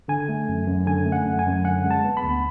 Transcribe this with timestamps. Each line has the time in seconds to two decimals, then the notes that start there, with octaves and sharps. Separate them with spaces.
0.08 D3 G#5
0.29 A3
0.48 F#2
0.67 F#2
0.87 D3 G#5
1.06 A3
1.12 F#5
1.26 F#2
1.39 G#5
1.46 F#2
1.65 D3 F#5
1.84 G#3
1.91 A5
2.04 B3
2.17 B5
2.23 D2